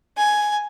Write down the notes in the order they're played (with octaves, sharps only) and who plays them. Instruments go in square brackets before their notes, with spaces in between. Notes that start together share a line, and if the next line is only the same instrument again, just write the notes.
[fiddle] G#5